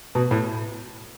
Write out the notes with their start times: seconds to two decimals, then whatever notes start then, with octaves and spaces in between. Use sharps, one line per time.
0.15 B2
0.31 A2